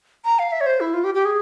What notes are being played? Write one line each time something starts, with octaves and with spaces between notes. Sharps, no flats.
A#5
F5
E5
C#5
C5
E4
F4
G4
G4
G#4